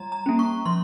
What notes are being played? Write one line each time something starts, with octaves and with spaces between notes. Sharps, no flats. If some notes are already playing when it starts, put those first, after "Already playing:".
Already playing: G3 A#5
A#5
A#3 C#4
C#6
F3 C6